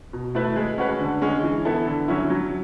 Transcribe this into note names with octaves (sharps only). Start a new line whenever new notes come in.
B2
A3 E4 B4
G#3
C#4 F#4 B4
D3
G#3 C#4
E3
B3 E4 A4
D3
F#3 C#4 E4
F#3